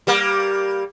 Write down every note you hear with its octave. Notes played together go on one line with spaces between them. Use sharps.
G3 A#3